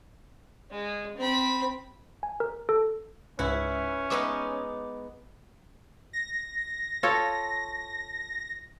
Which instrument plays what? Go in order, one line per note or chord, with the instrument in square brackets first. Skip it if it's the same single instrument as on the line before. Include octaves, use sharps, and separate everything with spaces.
[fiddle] G#3
C4 B5
[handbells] G#5
A#4
A4
[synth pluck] C#2 G#2 [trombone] C#4 [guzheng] E4 [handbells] B4 E5
[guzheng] G#3 B3 D#4 [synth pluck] B4 C#5 E5 [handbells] D6
[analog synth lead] A#6
[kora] F4 A4 C#5